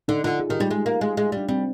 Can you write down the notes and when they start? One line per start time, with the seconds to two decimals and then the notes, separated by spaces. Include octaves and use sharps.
0.08 D3 D#4
0.24 D3 F4
0.40 G#4
0.50 D#3 G4
0.60 G3 D#4
0.71 G#3
0.86 A#3
1.01 G#3
1.17 G#3
1.32 G3 D4
1.49 G3 C4